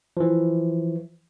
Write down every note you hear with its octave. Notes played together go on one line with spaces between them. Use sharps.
E3 F3